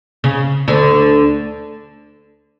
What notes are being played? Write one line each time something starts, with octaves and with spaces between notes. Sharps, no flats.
C#3
D2 D3